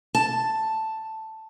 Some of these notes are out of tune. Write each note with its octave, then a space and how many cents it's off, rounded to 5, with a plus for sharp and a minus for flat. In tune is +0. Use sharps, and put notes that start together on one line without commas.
A5 +5